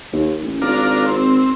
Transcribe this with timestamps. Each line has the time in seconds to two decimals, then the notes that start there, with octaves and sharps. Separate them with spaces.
0.13 D#2
0.42 A1
0.62 G#1 D4 F4 A#4
1.06 C4